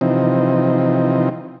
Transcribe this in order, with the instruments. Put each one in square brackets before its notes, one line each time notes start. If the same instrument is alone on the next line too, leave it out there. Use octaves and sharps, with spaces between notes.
[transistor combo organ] C3 E3 F3 C4 D#4